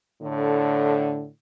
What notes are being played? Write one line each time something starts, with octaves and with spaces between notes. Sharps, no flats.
A2 D3